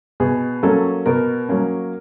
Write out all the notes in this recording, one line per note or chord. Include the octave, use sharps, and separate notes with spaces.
B2 G#4
F#3 A#3 C#4 A4
B2 A#4
F#3 A#3 C#4